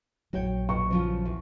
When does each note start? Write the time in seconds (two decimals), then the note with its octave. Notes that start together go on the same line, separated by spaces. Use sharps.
0.33 A#1 F#3 F#4 C#5 G5
0.69 B2 C#6
0.90 C#3 F3 F4
1.25 E2